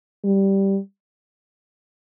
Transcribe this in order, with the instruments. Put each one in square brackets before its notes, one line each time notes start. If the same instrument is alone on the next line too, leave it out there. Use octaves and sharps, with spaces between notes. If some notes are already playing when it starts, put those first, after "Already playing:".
[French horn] G3